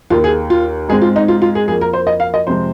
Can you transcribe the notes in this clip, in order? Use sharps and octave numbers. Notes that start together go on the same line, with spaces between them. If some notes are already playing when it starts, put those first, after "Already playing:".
D#2 D#3 A#3 F4
G#4
F4
G#2 G#3 C4 G#4
F4
D#4
F4
F4
G#4
F2 F3 A#3 G#4
A#4
C5
D#5
F5
D#5
F2 C3 G#3 C4 C5